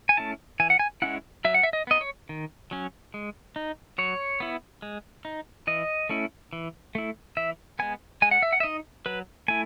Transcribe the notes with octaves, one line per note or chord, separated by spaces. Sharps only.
G#5
A3 C#4 E4 A5
E3 G#5
F#5
G#5
G#3 C#4 E4 F#5
F#3 E5
F#5
E5
D#5
B3 D#4 D#5
C#5
D#3
F#3 C#4
G#3
D#4
F#3 C#5
B3 E4
G#3
D#4
E3 D#5
A3 C#4 E4
E3
A3 E4
E3 E5
G#3 B3 G#5
G#3 G#5
F#5
E5
F#5
E5
D#4 D#5
F#3 B4
A3 E4 G#5